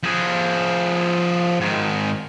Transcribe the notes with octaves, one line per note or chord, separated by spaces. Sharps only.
F3 G#4
G#2 D#3